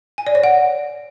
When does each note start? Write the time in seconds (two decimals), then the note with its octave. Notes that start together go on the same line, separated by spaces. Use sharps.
0.18 G#5
0.27 D5
0.35 C#5
0.44 F#5